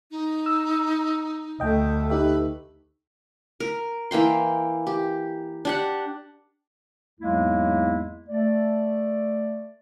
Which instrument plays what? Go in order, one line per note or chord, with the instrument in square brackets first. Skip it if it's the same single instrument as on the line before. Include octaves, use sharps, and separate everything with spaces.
[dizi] D#4
[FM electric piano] E6
[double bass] D2 A3 [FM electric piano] D#5 G5
[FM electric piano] D#4 G4 E5 [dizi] B4
[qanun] A#4
E3 A#3 G5 C6
G4
D4 G4 F#5
[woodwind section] E2 G#2 F#3 G#3 A#3 E4
A3 D5